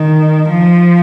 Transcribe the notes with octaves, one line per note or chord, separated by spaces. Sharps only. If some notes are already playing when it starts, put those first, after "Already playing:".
Already playing: D#3
F3